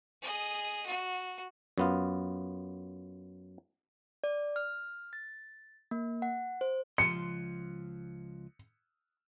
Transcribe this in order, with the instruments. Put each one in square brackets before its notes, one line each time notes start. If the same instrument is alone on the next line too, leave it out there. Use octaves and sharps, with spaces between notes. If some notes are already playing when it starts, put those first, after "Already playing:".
[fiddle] G#4 D#5
F#4
[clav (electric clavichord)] F#2 B3 F4
[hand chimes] D5
F6
A6
A#3
F#5
C5
[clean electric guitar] C#2 F3 C6 [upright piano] C#7